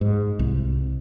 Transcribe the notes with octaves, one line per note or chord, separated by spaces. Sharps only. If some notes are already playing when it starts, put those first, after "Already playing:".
G#2
C2